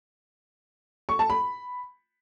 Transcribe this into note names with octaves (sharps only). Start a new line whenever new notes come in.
C#6
A5
B5